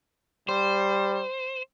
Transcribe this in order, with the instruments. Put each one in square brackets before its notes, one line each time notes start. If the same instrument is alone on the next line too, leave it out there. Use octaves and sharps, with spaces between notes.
[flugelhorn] G3 [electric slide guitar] C5